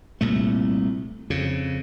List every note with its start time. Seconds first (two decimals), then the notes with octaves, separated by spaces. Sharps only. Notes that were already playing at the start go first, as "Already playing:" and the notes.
0.21 C2 A#2 A3
1.30 F2 C#3